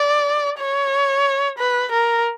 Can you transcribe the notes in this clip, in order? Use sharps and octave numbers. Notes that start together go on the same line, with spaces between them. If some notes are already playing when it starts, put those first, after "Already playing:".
Already playing: D5
C#5
B4
A#4